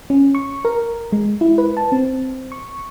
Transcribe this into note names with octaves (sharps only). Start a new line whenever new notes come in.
C#4
C#6
A#4
G#3
E4
B4
A5
C4
C#6